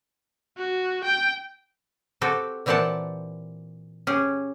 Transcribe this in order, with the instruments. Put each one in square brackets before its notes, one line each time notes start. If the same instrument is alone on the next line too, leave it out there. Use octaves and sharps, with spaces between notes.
[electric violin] F#4
G5
[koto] C4 F#4 G4 A4
A#2 E3 C4 G4 F#5 A5
C#4 G4 G#4